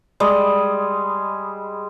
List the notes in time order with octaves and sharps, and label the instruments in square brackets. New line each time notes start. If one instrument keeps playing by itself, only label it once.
[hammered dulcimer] G3 G#3 D#5